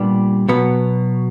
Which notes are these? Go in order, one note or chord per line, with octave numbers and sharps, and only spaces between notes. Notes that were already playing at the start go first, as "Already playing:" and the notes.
Already playing: A#2 G3 B3 D4 G4
B2 F#3 B3